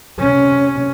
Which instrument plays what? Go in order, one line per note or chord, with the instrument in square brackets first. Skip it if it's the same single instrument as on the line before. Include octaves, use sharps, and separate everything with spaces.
[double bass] C3 C#4